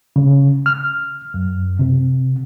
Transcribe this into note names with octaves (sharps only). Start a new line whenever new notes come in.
C#3
F6
F#2
C3